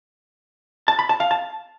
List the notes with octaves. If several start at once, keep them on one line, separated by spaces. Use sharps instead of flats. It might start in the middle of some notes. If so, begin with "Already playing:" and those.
A5
B5
A5
F5
A5